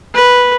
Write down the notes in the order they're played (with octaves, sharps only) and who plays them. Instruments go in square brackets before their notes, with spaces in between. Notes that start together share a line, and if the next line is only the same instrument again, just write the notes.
[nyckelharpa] B4